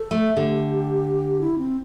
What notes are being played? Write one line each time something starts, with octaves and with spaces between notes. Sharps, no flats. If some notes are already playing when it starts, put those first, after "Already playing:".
Already playing: A4
A3
D3 G4
E4
C4